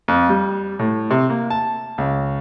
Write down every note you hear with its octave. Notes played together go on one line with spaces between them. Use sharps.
F2
G3
A2
C3
A#3
A5
C#2